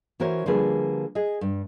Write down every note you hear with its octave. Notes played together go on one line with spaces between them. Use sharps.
E3 C#4 F#4 A#4 C5 C#5
D3 F3 G3 A#3 G#4 B4
G#4 D#5
G2